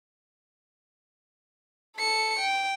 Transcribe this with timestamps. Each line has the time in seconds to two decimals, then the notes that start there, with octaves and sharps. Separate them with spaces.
1.97 A4 C#7
2.39 G5